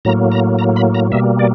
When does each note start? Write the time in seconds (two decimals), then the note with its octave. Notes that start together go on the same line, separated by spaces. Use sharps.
0.05 A2 F#3 A#3 A#5
0.32 A#5
0.59 A#5
0.76 B5
0.95 A#5
1.11 B2 G3 A#3 E5
1.39 D5